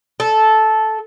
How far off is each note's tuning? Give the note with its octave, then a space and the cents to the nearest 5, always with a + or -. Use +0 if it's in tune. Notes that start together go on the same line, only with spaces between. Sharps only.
A4 -10